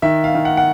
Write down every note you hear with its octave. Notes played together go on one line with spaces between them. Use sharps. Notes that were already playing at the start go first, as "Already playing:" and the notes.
D#3 E5
F5
D#3
F#5
F#5